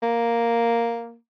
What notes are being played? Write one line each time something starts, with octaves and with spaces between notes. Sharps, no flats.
A#3